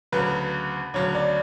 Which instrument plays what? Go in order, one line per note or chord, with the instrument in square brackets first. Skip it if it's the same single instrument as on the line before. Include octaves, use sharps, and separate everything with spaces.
[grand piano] D2 C#3 F#3 [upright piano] B4
[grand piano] D2 C#3 F#3 [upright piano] C#5
[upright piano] D5